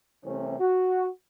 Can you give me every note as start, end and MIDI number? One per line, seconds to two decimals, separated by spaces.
0.24 0.58 36
0.24 0.58 48
0.24 0.58 52
0.24 0.58 57
0.24 0.58 60
0.24 0.58 61
0.60 1.07 66